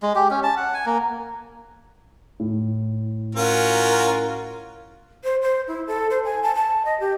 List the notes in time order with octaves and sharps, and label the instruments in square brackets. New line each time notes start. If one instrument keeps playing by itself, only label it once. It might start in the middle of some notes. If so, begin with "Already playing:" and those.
[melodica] G#3
G4
C#4
A5
F#5
G#5
A#3
[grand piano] A2
[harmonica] C#4 F4 F#4 [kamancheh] A#4
[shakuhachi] C5
C5
E4
A4
C5
G#5
A5
A5
D#5
G4